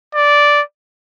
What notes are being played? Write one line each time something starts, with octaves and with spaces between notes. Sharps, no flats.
D5